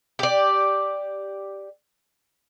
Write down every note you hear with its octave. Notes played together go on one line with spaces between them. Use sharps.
G4 D5